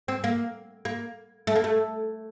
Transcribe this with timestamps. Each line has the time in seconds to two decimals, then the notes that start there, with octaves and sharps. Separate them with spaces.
0.08 C4
0.24 A#3
0.85 A#3
1.47 A3
1.55 A#3
1.64 A3